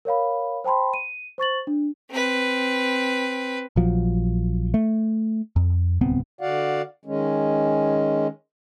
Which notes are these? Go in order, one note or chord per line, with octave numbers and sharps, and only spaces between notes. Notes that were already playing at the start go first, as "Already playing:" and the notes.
A#4 C#5 F5 B5
C5 G5 A5 B5 C6
D#7
C5 C#6 A6 F#7
D4
C4 B4
A#1 F3 F#3
A3
F2
D1 C2 B3 C4
D3 F#4 D5 F5 F#5
D#3 G#3 C#4